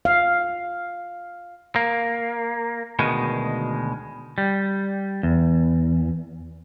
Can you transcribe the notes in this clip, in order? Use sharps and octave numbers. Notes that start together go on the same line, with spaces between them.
F5
A#3
D2 B2 D#3 G#3
G3
E2